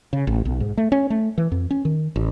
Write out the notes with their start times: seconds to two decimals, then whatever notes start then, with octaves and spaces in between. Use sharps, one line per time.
0.13 C#3
0.27 A1
0.45 B1
0.60 G#2
0.77 A3
0.92 C#4
1.10 A3
1.38 E3
1.52 F2
1.71 C#4
1.85 D#3
2.16 A1